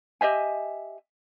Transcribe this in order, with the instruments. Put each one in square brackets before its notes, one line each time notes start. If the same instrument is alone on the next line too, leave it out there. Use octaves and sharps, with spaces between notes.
[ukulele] G4 D#5 E5 G#5